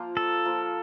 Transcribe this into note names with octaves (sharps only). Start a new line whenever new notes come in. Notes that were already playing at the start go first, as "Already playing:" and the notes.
Already playing: F3 A#3 F4 C5
A4
F3 A#3 F4 A#4